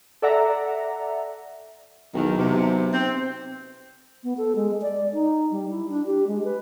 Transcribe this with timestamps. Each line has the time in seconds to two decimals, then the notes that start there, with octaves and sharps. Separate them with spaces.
0.22 A4 D5 E5 F#5 A#5
2.14 B1 E2 D#3
2.37 C3
2.92 C4
4.24 B3
4.37 A4
4.56 G#3
4.82 D5
5.13 D#4
5.51 G3
5.70 E4
5.89 D4
6.06 G4
6.27 G#3
6.44 B4